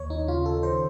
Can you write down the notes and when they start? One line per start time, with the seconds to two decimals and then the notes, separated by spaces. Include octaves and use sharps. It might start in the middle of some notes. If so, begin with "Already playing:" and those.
Already playing: D#2 C#5
0.10 D#4
0.28 C#3 F4
0.46 A4
0.63 D#3 C5